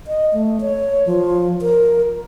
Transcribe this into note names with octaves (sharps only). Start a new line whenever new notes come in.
D#5
A3
C#5
F3
A#4